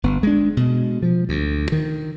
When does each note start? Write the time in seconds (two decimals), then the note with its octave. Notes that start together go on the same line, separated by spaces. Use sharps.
0.03 G1 B3
0.23 G#3 D4
0.57 B2 G#3
1.03 F3
1.29 D2
1.72 D#3